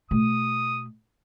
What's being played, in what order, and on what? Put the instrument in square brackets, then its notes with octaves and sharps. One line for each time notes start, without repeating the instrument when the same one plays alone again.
[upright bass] B2 A3 [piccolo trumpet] D#6